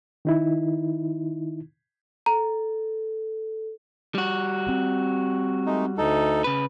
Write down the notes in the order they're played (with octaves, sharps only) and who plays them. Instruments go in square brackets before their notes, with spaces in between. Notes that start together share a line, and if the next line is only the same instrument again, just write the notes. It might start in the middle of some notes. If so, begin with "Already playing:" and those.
[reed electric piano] D#3 D#4 E4
[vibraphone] A4 [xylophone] A#5
[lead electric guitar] G3 F#4
[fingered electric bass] C4
[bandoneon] G#3 A3 D#4
D2 D#4 A4
[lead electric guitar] C#3 B4